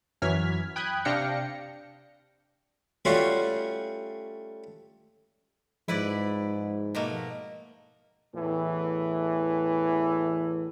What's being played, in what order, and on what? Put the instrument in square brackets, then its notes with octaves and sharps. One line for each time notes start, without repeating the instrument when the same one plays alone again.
[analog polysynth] F#2 E3 F#3 F6 G#6 B6
G5 B5 D#6 F#6 G#6
C3 D4 F5 G5 A#6 C#7
[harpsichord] G3 A3 C#4 F4 F#4 C5
[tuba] G#2 [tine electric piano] F3 [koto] E4 B4 D5
[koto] B2 A3 A#3
[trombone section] E2 A2 E3